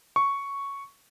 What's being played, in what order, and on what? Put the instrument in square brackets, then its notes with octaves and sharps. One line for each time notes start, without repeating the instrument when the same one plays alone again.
[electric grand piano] C#6